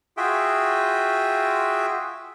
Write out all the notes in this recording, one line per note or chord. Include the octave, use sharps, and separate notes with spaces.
F4 F#4 G#4 E5 G5